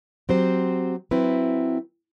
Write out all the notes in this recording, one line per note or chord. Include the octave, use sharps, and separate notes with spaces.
F#3 C4 G4 C5
F#3 C4 E4 B4